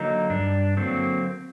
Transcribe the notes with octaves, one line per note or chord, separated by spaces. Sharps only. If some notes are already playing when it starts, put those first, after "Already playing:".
Already playing: D3 F#3 A#3 D#4
G2 D4
D3 F#3 A#3 C4